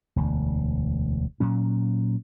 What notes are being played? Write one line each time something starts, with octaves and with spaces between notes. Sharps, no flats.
E1 D2
A#2 F#3 C#4